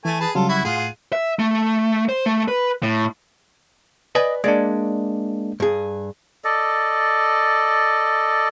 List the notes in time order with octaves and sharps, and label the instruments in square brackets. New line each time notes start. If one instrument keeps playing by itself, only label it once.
[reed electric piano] E3 [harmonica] A3 G#5
[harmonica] G#4 B4 A5
[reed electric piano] C#3 F#3 G3 [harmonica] F4 A4
[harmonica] E4 F#4
[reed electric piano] A2 [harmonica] F4 G#4 F#5
[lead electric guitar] E5
A3
C5
A3
B4
A2
[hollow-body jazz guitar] B4 D5 G#5 [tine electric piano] D#5
[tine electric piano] G#3 A#3 D4 [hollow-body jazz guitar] D5
[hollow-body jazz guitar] G2 G#4
[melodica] A4 D5 D#5